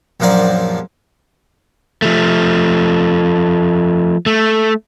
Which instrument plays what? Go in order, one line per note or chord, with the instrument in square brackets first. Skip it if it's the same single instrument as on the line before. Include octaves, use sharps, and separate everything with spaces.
[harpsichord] A#1 F#2 F3 A#4 D5
[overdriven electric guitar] F3 A3
A3